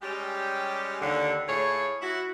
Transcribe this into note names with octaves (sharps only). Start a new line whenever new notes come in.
G3 G#3 C#4 G4
D#2 D3
A2 F4 G#4 C#5
E4 F#4